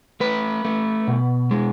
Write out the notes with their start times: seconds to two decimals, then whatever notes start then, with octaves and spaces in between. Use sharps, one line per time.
0.20 A3 B4
0.65 A3
1.08 B2
1.51 G#3